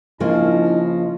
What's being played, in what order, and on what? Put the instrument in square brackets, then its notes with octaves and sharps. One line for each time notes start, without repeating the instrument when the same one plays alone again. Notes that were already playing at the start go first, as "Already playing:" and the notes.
[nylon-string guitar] C#3 F3 A#3 [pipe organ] D4 E4 D#5